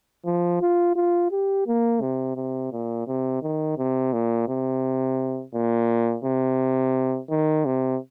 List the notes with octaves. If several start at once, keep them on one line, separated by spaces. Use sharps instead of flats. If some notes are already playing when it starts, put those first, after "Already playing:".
F3
F4
F4
G4
A#3
C3
C3
A#2
C3
D#3
C3
A#2
C3
A#2
C3
D#3
C3